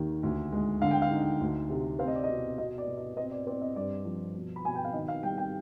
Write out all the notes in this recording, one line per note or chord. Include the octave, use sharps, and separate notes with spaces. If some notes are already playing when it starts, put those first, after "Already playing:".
Already playing: D#2 D#3
D2
G#3
D3 F5
G5
F5
D#4
D2
C3
C4 F5
D#5
D5
B2 D#5
B2 D#5
D5
B2
D#5
C4 D#5
D5
C4 D5
D#5
G2 D5
F3
B2
B5
B2 G#5
G5
F5
D#3 D#5
F5
G3 G5
G5